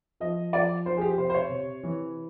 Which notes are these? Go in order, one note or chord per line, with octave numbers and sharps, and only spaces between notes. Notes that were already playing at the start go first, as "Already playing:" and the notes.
F3 D#5
F3 D5
F3 C5
G#4
G4
C3 C5
C5
C#5
C3
E3